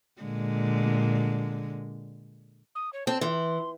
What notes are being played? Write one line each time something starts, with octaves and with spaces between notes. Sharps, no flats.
A#2 D3 G#3
D#6
C#5
C4 A5
E3 C6